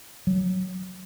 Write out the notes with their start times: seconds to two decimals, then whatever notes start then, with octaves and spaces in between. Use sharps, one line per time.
0.27 F#3